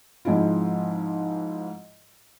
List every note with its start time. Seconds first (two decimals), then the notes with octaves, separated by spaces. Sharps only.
0.25 G#2 F3 G#3 C4 E4 F4